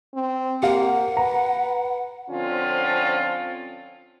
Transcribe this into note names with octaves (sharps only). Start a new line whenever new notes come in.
C4
A#3 G4 F5 F#5
B4 A#5
D3 F3 C4 C#4 F4